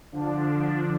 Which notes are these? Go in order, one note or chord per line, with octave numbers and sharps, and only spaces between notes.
D3 F3 D4